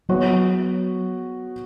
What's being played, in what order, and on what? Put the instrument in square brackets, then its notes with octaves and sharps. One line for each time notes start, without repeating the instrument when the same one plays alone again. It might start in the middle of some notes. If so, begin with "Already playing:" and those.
[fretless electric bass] F#3 [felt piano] B3 F#4 C#5